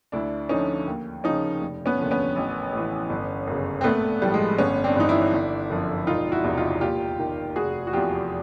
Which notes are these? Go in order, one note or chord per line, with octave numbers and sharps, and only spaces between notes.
D2 D4 E4
D3 F3 C#4 D#4
D#2
C#3 F3 C#4 D#4
F1
B3 C#4
D#2 D3 F3
B3 C#4
A1
A2 E3
G1
F#2 C#3
C4
A#1 A3 B3
A2 F3 G3
G#3
G1 B3 C#4
C4 D4
G2 E3 D#4
D4 E4
G1
F#2 D3 F3
E1 D#4 F4
E4 F#4
E2 C3
D#4 F4
D#2 F4 G4
D#3
F1 F#4 G#4
F#4
E2 C3 F3 F4 G4